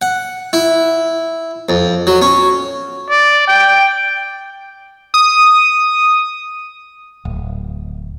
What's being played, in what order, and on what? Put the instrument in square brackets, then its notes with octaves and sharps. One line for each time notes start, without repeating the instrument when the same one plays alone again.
[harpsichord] F#5
E4
F2
F#3
C#4
[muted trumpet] D5
G5
[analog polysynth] D#6
[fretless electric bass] D1